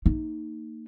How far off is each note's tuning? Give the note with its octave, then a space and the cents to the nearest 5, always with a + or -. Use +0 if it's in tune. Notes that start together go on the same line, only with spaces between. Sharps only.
A#3 -25 D#4 +0